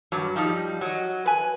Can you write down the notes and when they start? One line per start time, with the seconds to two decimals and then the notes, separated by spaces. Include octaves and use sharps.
0.12 G2 F#3
0.36 F3 G3 D#4
0.81 F#3 D#5
1.26 B4 G#5